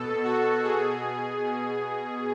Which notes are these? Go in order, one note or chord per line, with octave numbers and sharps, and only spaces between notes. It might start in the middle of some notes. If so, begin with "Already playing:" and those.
Already playing: B2 A4
F#4
B2 G#4
B2